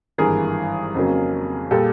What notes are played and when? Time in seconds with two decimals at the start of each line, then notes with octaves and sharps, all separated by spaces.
0.18 G#1 G2 E3 G#4 A#4
0.95 F2 C#3 F#3 A#3
1.71 A#2 G3 G4 A4